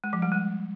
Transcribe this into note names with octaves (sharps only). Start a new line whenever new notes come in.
G#3
F3
G3
G#3